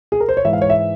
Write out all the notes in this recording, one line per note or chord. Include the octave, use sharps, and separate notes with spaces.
G#4
A#4
C5
C#5
G#2 E3 E5
F5
C#5
E5